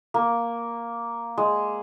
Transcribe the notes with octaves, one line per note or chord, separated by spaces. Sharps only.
A#3
G#3